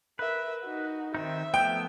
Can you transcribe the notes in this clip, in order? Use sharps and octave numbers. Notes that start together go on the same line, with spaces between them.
A#4 B4 E5
D#4 F#4
D#3 C4 D#4 E5
F3 A3 B3 G5